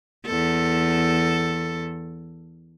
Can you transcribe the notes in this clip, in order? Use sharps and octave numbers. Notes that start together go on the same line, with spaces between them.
E2 A4